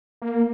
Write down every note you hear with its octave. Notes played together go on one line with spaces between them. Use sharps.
A#3